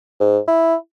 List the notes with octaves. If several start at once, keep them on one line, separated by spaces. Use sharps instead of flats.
G#2
E4